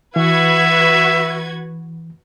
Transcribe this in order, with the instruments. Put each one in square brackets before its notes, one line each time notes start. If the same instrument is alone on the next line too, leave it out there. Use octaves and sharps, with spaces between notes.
[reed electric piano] E3 [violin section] F#4 B4 G#6 [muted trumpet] E5